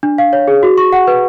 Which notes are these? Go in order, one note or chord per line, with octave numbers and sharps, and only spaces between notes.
D4
F5
C#5
G#4
F#4
C#6
F#5
B4